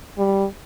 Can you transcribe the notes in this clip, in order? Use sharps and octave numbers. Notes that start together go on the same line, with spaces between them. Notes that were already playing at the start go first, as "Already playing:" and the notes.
G3